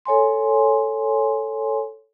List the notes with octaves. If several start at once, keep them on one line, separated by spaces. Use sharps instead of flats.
A4 C#5 G#5 C6